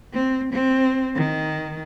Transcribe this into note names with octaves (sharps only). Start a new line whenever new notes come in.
C4
C4
D#3